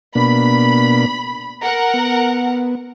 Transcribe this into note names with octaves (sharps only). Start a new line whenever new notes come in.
B2 A#3 D4 B5
A#4 F#5 A#5
B3